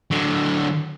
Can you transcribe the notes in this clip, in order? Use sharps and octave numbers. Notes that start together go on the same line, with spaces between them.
D3 F#3